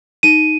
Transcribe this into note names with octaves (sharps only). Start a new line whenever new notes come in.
D#4 D#7